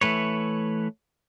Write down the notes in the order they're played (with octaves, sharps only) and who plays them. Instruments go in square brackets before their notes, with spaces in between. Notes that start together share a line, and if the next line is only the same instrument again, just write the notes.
[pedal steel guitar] E3 A3 B4 C#5